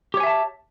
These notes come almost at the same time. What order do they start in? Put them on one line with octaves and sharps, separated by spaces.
G4 C#5 G#5 E5 A5